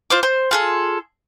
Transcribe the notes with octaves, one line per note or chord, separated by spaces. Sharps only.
F4 C5 D6
C5
F4 G#4 A4